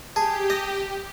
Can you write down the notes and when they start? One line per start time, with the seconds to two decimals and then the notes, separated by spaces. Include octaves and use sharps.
0.16 G4 G#4 A5
0.50 D#5